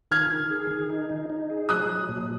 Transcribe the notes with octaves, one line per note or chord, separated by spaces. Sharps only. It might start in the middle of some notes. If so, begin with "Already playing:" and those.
D#3 F6 G#6
D#3
G#4
D#3
D#4
D#4
D#4
G#4
F#3 D#6 F#6
F#3
A#2